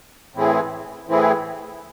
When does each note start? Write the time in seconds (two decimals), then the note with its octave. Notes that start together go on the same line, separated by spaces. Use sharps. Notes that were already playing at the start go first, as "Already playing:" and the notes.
0.34 A2 E3 C4 E4 G#4
1.08 A2 E3 C4 E4 G#4